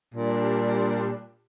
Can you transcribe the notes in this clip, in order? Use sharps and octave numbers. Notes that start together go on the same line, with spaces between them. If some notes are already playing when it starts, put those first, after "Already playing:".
A#2 G3 D4